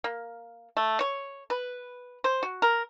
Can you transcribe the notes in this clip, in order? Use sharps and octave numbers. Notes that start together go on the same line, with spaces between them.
A#3
A3
C#5
B4
C5
F#4
A#4